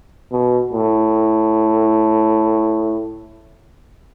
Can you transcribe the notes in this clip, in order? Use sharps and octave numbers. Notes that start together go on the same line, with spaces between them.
B2
A2